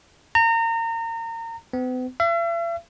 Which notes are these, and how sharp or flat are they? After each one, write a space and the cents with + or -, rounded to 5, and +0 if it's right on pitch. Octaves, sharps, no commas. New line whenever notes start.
A#5 -30
B3 +45
E5 +45